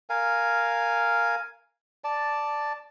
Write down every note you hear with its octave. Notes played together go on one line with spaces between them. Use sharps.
A#4 F5 G#5
D5 A5